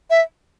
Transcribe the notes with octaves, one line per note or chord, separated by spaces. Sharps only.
E5